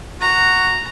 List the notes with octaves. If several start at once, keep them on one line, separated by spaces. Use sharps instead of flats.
F#4 A#5